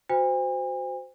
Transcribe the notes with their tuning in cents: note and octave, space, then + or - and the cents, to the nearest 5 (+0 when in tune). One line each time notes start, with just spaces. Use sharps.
F#4 -5 C5 -20 G#5 -45